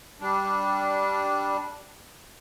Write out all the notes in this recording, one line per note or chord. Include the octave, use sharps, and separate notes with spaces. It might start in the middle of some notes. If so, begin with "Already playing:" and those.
G3 D4